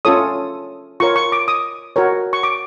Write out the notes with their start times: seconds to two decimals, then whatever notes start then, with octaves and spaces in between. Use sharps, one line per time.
0.05 C#4 F4 A4 C#5 D#6
1.00 F4 A#4 C#5 C#6
1.16 C#6
1.32 D6
1.48 D#6
1.96 F#4 A#4 C#5
2.33 C#6
2.43 D6